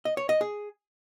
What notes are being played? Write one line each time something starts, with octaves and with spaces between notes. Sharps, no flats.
D#5
C#5
D#5
G#4